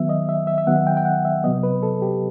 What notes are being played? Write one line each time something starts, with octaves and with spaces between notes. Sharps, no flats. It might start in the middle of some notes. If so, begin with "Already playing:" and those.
Already playing: D#3 F#3 B3 E5
D#5
E5
E5
E5
D#3 F#3 B3 F#5
G5
G5
F#5
E5
C3 F#3 B3 D#5
B4
A4
G4